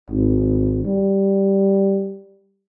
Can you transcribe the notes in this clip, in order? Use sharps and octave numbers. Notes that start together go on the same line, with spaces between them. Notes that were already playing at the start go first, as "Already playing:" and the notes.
G#1
G3